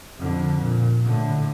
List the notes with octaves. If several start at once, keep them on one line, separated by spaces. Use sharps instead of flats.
F2 D3
A#2
A2 D3